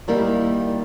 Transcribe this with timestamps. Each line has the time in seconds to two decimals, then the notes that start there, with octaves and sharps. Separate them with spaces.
0.08 D#3 G3 A#3 E4